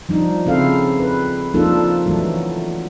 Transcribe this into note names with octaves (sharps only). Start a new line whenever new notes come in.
F3 G3 D4 D#4
C#3 C4 E4 A4 F5
B4
F3 A#3 D4 D#4 F4 A4
E3 F#3 A3